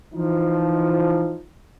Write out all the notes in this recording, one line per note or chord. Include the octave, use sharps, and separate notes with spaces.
E3 F3 D#4